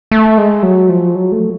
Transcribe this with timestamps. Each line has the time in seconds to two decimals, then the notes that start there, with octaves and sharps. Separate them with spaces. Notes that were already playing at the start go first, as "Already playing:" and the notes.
0.11 A3
0.38 G#3
0.63 F#3
0.89 F3
1.15 F#3
1.32 A3